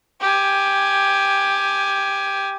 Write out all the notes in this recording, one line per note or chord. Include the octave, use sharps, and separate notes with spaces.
G4 G#5